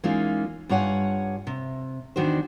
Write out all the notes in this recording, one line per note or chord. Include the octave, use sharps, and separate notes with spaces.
E3 G#3 A#3 C#4 D#4 F4
G2 F4 C#5 F#5 G#5
C3
E2 D#3 D4 F#4 C5